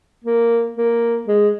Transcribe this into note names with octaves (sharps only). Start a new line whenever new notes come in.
A#3
A#3
G#3